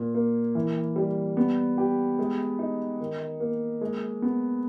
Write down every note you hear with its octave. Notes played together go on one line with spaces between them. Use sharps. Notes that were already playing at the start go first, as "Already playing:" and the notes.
Already playing: A#2
A#3
E3
G3
B3
G4
G#3
D#4
D#3
A#3
G#3
B3